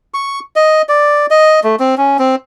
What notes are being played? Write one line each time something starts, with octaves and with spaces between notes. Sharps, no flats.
C#6
D#5
D5
D#5
A3
C4
C#4
C4